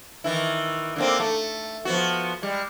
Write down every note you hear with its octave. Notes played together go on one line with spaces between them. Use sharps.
D#3 E3 E4
D3 A#3 C4
A3
F3 B3 F#4
G3 G#3